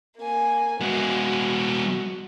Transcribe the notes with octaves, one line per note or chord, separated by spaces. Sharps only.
A#3 G#5
G#3 B3 F#4